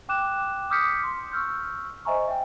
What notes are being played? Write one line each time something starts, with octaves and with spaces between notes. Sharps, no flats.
G5 D6 F#6 E7
D6 D#6 F6 G6 B6 C#7
C6
C#6 E6 F6 G6
C5 D#5 E5 G#5 A#5 C#6
E5 G5